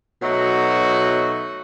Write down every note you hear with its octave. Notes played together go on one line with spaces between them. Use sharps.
B2 F#3 A3 D#4 F#4